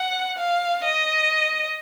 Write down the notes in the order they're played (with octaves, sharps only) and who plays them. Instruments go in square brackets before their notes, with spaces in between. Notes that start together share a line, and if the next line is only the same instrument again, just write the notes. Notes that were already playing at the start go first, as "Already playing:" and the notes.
Already playing: [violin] F#5
F5
D#5